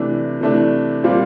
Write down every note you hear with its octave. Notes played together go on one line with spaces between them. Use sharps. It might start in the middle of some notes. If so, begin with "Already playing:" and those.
Already playing: C3 E3 A3 D4
C3 E3 A3 D4
A#2 G3 C4 F4